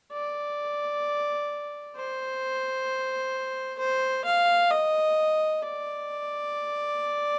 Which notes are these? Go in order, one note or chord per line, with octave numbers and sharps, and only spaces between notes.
D5
C5
C5
F5
D#5
D5